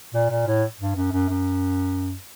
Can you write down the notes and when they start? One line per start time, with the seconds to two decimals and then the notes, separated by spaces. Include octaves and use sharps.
0.14 A#2
0.30 A#2
0.47 A2
0.80 G2
0.96 F#2
1.12 F#2
1.29 F#2